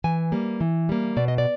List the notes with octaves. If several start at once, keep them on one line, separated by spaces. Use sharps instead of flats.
E3 G#5
G3 A#3
E3
G3 A#3
B2 D5
D#5
D5